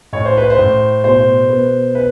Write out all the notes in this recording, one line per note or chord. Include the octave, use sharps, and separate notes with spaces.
A2 C#5
C5
B4
C5
A2
B2 C5
B3
B4